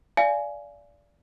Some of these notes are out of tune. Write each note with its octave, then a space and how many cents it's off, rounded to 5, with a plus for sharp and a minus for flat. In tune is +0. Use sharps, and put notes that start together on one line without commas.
D5 -15 F5 -30 G#5 +15